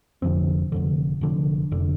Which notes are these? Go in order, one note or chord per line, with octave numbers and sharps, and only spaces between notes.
F1 F2 D3 C4
F1 F2 D3
F1 F2 D3
F1 D3